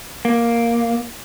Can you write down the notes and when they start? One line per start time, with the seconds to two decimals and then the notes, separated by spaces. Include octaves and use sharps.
0.25 A#3